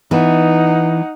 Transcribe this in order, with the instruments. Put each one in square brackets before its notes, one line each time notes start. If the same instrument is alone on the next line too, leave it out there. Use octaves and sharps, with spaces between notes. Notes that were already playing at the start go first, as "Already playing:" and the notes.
[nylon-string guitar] E3 B3 [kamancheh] D#4 F#5